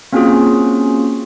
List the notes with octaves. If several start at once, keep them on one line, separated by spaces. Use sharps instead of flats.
A#3 C4 C#4 F4 F#4 G#4